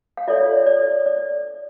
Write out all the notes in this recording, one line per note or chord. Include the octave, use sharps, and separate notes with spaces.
F5
F4 A4 C#5 D5 E5
C#5
D5
D5